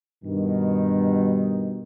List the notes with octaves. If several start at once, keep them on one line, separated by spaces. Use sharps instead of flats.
G2 B2 D#3